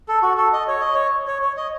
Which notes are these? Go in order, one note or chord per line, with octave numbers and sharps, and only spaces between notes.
A4
F#4
A4
D#5
C#5
D#5
C#5
C#5
C#5
D#5